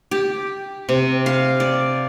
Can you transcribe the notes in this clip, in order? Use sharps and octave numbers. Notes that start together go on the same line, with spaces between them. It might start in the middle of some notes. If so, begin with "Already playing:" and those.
G4
C3
F5
D5